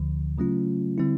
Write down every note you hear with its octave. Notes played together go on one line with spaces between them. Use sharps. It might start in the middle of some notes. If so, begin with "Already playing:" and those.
Already playing: D2 D3 F3
C#3 F#3 A3 C#4 F4
D3 G3 C4 E4